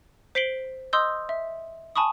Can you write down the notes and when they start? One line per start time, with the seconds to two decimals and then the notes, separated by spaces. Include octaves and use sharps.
0.35 C5 B6 C7 D7 F#7 G7
0.93 D#5 C6 D#6 E6 G6
1.29 E5
1.96 G#5 A5 B5 C#6 D#6